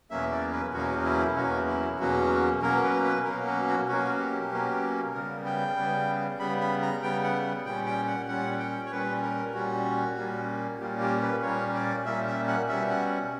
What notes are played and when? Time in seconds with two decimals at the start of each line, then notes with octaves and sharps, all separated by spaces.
0.11 E2 B2 F#3 A#3 C#4 E5
0.31 D5
0.52 B4
0.73 E2 B2 F#3 A#3 C#4 F#4
1.05 E4
1.36 E2 B2 F#3 A#3 C#4 F#4
1.68 E4
1.99 E2 B2 F#3 A#3 C#4 F#4
2.62 B2 F#3 A#3 C#4 A#4
2.83 B4
3.04 B4
3.25 B2 F#3 A#3 C#4 A#4
3.46 F#4
3.67 F#4
3.88 B2 F#3 A#3 C#4 F#4
4.19 G4
4.51 B2 F#3 A#3 C#4
5.14 C#3 G3 B3 A#4
5.45 G5
5.76 C#3 G3 B3
6.39 C#3 G3 B3 B5
6.61 B5
6.82 A#5
7.03 C#3 G3 B3 G5
7.23 F#5
7.65 A#2 G3 C#4 G5
7.86 G5
8.07 F#5
8.28 A#2 G3 C#4 F#5
8.59 G5
8.86 C#5
8.91 A#2 G3 C#4 B4
9.23 A#4
9.54 A#2 G3 C#4 F#4
10.17 A#2 G3 A#3 C#4
10.80 A#2 G3 A#3 C#4 G4
11.01 G4
11.22 B4
11.42 A#2 G3 A#3 C#4 C#5
11.74 D5
12.06 A#2 G3 A#3 C#4 E5
12.27 E5
12.48 F#5
12.68 B2 G3 C#4 E5
12.90 F#5